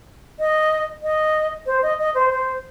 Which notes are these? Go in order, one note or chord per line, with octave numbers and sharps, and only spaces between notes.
D#5
D#5
C5
D#5
D#5
C5
C5